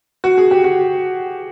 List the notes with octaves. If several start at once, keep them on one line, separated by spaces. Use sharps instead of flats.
F#4
G#4
G4
F#4